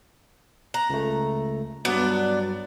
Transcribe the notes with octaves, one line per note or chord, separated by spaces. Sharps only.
A#5 F#6
C#2 A3
G2 F#3 B3 D4